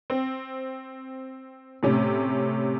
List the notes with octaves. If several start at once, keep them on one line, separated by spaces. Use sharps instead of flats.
C4
A2 C3 C#4